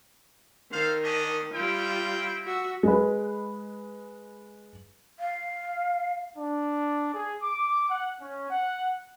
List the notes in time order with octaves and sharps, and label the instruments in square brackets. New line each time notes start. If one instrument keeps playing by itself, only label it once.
[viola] D#3 [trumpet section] A4 C5 F5
[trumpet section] C#4 D4 D#5
[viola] G3 F4 [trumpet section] C4 E4 G5
[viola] F#4 E5
[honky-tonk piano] G#3 B4
[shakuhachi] F5
[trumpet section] D4
G#4
D6
F#5
C#4
F#5